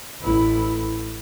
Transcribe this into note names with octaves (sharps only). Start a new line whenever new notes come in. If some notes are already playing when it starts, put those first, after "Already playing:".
A1 E4